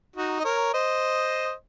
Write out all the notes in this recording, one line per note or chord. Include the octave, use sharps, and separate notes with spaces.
D#4 F#4
D#5
A#4 C#5
C5 D#5